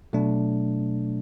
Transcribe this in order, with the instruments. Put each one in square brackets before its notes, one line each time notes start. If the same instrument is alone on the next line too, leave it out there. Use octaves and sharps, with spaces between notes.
[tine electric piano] B2 F#3 A3 D4